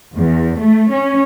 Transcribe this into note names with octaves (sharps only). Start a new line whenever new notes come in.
E2
A3
C#4